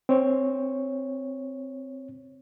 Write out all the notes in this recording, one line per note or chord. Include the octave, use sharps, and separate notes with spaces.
C4 C#5